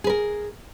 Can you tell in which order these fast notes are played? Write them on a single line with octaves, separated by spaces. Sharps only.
G#4 B4 A#4